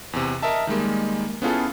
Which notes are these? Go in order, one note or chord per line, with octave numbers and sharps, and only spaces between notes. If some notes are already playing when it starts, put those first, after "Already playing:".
E2 C3
A#4 D#5 E5 A5
D#3 G3 G#3 A#3
B3 C#4 E4 F4 G#4 A4